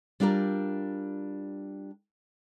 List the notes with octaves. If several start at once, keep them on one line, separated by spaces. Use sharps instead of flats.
G3 D4 F4 G4 A#4